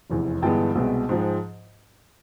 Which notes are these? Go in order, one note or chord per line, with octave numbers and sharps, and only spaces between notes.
F1 E2 C3 E3
G1 G2 E3 G#3 B3 G5 A5
C2 B2 G#3 B3
G#2 F3 G#3